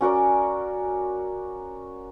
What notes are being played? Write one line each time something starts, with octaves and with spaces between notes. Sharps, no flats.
C#4 F#4 A#4 D5